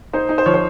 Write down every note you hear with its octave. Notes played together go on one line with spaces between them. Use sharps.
D#4 C5
D#4
C5
F3 C#5
C5